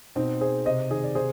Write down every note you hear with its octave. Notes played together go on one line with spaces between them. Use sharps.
B2 C4 D#4
G#4 C5
C3 C5 D#5
D#3 G#4 C5
D5
C3 G#4 C5